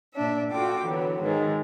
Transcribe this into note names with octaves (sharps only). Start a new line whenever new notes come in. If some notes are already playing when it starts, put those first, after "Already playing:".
A#2 D4 E5
F4 F#4 A4 G5 D6
D3 E3 F#3 B3
G#2 D#3 G#4